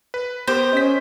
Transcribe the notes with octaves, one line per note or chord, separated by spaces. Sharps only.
B4
B3 G4 A#4 C5
C#4 D#5 B6